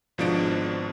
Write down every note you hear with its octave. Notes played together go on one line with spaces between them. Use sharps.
G#1 B2 F3 G#3 D4 D7